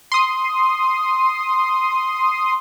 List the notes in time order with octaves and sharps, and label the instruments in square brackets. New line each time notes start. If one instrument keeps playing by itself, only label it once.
[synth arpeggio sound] C6 D#6